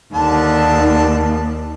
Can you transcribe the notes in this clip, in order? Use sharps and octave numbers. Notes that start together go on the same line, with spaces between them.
D#2 D3 D4 A5